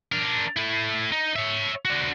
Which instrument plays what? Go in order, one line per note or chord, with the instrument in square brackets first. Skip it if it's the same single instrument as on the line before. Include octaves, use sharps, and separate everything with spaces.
[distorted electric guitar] D4 A#4
A3 E4
D#4
C#5 E5
D4 F#4